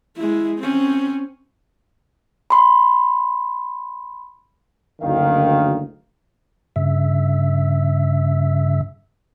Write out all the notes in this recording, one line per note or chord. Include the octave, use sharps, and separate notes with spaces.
G#3 E4
C4 C#4
B5 C6
F#1 D2 D#3 F5
G2 C#3 E5